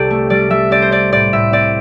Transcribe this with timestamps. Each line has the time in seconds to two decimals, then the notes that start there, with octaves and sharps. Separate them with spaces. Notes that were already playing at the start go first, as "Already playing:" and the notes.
Already playing: C2 C3 G4 A4 D5
0.10 A3
0.30 G3 D5
0.50 G3 E5
0.71 C4 D5
0.82 C5
0.92 C4 D5
1.12 A2 D5
1.33 A2 E5
1.52 C4 D5